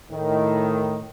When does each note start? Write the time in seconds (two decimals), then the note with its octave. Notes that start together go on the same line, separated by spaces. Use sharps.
0.12 A2 D#3